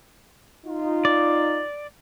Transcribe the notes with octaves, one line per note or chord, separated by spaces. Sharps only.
D#4 F4
D5